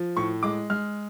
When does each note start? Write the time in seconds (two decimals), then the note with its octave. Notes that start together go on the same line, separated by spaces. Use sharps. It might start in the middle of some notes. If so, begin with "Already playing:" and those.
Already playing: F3
0.17 A2 C#6
0.43 G#3 D6
0.70 G#3 F6